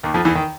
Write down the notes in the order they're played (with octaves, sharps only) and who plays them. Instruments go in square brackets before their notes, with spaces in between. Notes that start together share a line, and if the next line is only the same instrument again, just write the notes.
[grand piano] D#2 D#3
F2 F3
E2 E3
D#3